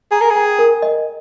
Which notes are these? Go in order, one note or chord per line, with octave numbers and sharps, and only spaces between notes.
G#4 A#5
A#4
G#4
G5
A#4
D#5